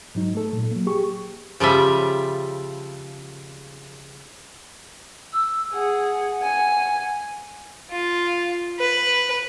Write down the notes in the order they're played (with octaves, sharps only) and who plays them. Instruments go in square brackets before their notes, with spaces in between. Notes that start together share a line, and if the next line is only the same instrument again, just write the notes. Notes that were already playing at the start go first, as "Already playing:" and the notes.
[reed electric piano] G#2 F#3 D#4
A3 A4
A#2
F#3 A#3
G4 G#4 C#6
[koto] C#3 F3 G3 E5
[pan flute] E6
[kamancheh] G#4 [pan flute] F#5
[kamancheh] G#5
[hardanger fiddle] F4
B4